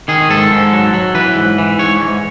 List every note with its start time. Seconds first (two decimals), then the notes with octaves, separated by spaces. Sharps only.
0.08 D#3 G#4
0.29 G#2 A4
0.51 G#2
0.73 F#3
0.94 F#3
1.15 E3 B4
1.36 G#2
1.58 E3
1.79 G#2 C#5
2.01 G#2